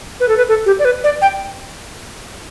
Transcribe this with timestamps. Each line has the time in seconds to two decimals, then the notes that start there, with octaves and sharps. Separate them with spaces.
0.20 B4
0.28 A4
0.38 B4
0.48 A4
0.66 G4
0.79 D5
0.85 B4
1.04 D5
1.22 G5